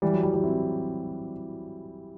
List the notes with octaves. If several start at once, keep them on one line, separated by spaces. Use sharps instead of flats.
E3 G3
F#3
E3 G3
E3 G3
C4 E4